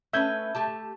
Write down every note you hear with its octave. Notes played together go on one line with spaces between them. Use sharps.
A3 C#4 B4 E5 G6 G#6
A3 G4 A5